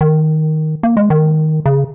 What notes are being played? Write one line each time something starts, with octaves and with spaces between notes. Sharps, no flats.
D#3
A#3
G#3
D#3
C#3